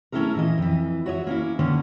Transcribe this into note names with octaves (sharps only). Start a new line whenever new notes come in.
A3 C#4 D#4 E4 A4 A#4
A#2 E3 D#5
F2 E3
F#4 C#5 D#5 E5
A#3 C#4 E4
D3 D#3 A#3 C#4